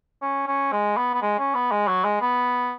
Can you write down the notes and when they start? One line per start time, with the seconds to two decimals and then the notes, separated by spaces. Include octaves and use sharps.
0.22 C#4
0.47 C#4
0.72 G#3
0.97 B3
1.14 B3
1.22 G#3
1.39 C#4
1.54 B3
1.71 G#3
1.87 F#3
2.04 G#3
2.21 B3